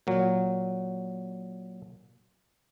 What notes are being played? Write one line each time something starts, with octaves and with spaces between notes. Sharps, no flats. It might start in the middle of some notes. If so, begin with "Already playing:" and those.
A#2 F#3